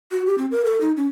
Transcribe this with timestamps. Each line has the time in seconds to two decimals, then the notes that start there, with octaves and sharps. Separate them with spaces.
0.11 F#4
0.26 G4
0.38 C4
0.51 A#4
0.65 A4
0.81 D#4
0.97 C#4